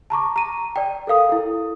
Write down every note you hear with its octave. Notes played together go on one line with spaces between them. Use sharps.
A5 A#5 C#6 D6
A#5 D#7
D5 G5
A4 A#4 F5 D#6
E4 A4